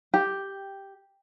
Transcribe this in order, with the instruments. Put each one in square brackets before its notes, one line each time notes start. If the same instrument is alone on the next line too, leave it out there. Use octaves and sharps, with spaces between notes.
[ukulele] G4